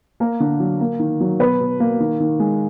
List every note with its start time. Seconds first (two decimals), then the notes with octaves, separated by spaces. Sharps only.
0.20 A#3 A#4
0.40 D3
0.60 F#3
0.81 A#3
0.99 D#3
1.20 F#3
1.39 B2 B4
1.60 B2
1.80 A#3
2.00 D#3
2.20 D#3
2.40 G#3